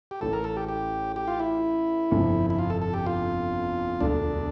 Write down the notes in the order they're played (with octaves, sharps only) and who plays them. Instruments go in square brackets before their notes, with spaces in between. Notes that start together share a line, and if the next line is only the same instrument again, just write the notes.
[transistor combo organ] G4
[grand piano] A1 A2 E3 [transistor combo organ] A4
[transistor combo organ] A#4
A4
G4
G4
G4
F4
E4
[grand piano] G1 F2 C3
[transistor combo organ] E4
F4
A4
A4
G4
F4
[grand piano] E1 D2 D3 [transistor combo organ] D4